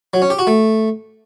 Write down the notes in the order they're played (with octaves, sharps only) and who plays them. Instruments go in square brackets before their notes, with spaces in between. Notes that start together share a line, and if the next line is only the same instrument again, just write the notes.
[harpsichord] F#3
C#4
G4
F#4
A3